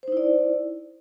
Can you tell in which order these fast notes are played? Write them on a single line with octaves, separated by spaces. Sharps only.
C5 D#4 E4 D5